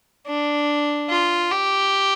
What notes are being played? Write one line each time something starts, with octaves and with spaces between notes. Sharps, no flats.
D4
F4
G4